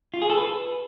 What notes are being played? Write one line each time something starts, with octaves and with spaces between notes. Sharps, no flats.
F4
G#4
A4
B4